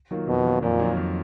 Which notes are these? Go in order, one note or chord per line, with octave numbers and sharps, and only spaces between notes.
D#3 F#3 A#3 F4
F2 B2
D#3 F#3 A#3 F4
F2 A#2
D#3 F#3 A#3 F4
F2